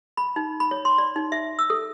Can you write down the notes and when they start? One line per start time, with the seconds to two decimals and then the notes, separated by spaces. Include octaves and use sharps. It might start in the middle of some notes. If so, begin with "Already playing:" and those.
0.17 B5
0.36 D#4
0.60 B5
0.71 C#5
0.85 C6
0.98 D5
1.16 D#4
1.32 E5
1.59 E6
1.70 A4